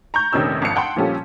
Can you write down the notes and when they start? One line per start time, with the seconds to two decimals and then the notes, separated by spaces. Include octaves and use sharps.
0.14 A#5 C#6 G6
0.33 F1 A#1 C3 D#3 C#4 E6
0.62 G#1 F2 F5 C#7
0.76 F#5 G5 A5 C6
0.96 A#2 F3 G3 C#4 G4 A4